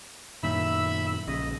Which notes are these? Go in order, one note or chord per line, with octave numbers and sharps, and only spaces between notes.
F#2 A#2 D#3 E5 B5 E6
A#1 C#3 D#5